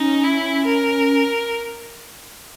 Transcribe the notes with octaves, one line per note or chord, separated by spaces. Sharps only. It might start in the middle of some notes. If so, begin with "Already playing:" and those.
Already playing: C#4 D#4
E4
A#4